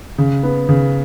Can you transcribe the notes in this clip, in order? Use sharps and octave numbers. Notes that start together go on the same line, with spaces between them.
C#3
B3
C#3